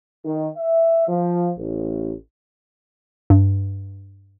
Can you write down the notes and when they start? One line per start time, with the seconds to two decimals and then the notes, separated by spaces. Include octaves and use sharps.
0.24 D#3
0.57 E5
1.09 F3
1.58 A1
3.30 G2